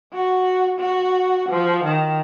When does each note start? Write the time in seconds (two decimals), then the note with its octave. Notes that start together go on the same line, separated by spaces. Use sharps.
0.13 F#4
0.79 F#4
1.49 F3
1.85 D#3